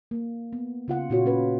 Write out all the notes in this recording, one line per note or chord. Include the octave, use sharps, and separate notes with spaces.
A#3
B3
C#3 F4 F#5
A#2 F4 F#4 C#5
C#4 F4 B4